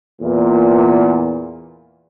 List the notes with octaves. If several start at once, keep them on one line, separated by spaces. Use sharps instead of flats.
E2 A#2